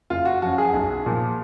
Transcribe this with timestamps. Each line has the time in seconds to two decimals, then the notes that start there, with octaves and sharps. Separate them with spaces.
0.10 F#1 F4
0.25 F#4
0.42 F#2 F3 F#4
0.58 G#4
0.74 B1
1.06 A#2 F3